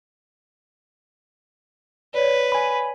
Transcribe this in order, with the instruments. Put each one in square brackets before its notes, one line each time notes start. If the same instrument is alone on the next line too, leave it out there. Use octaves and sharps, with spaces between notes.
[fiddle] B4 [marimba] C#5 D5
[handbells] G#5 B5